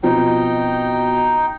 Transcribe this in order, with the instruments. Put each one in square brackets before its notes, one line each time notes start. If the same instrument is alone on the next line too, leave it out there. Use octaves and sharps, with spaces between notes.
[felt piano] B2 F3 C4 [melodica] D#4 G5